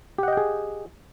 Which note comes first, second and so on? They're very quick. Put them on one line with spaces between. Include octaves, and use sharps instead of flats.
G4 F#5 D#5 G5 G#4